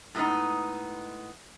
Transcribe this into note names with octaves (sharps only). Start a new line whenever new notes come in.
A2 G#3 A3 B3 D#4